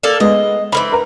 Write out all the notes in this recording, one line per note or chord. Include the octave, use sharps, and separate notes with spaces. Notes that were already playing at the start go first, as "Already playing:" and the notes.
A#3 A4 D5
G#3 B3 D#5
E3 A#3 C4 B5
A#4 B4 A#5